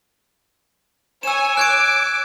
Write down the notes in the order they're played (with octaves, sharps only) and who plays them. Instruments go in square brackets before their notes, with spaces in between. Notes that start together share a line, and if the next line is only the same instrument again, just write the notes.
[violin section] C#5 G#5 [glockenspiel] E6 E7
[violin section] D6 [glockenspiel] F#6 G#6 D7